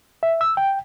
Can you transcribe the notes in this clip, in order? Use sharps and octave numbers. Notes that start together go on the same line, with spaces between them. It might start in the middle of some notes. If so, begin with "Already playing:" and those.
E5
E6
G5